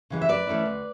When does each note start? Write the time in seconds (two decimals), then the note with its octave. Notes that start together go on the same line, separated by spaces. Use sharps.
0.10 C#3 E3 G#3
0.21 E5
0.29 F#2 B4 D5
0.47 E3 A3 C#4 E4
0.66 D2